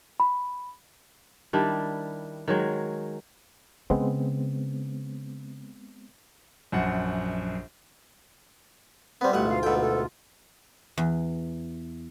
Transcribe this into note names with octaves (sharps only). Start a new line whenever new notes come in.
B5
D#3 G3 D4 E4
D#3 F#3 G#3
C#3 G#3 B3 C4
A#1 F#2 F#5
G3 B3 C4
A1 D2 G#2 B2 F4 G4 F#5
F5
B2 A4 G5
A4
E2